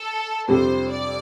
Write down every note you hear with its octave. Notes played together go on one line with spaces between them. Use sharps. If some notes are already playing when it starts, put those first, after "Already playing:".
Already playing: A4
F2 C3 G3 D4 A4 C5
D5